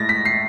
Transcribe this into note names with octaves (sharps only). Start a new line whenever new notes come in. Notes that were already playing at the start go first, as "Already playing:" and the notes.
Already playing: A2 G#3 A6 A#6
B6
C7